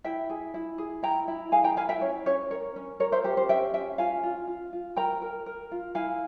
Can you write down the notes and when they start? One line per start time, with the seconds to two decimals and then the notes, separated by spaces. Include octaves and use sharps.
0.04 E4 E5 G5
0.30 G#4
0.54 E4
0.78 G#4
1.03 E4 G5 A#5
1.28 E4
1.52 G#4 F5 G#5
1.64 G5 A#5
1.76 E4 F5 G#5
1.89 E5 G5
2.01 C#4 C#5
2.26 C#4 C#5
2.51 A#4 C#5
2.76 C#4
3.00 A#4 C#5
3.12 C5 E5
3.24 G4 C5
3.37 C5
3.49 C#4 E5 G5
3.74 C#4 E5 G5
3.98 F4 F5 G#5
4.23 F4
4.47 F4
4.73 F4
4.96 A#4 G5 A#5
5.22 A#4
5.46 A#4
5.72 F4
5.95 E4 F5 G#5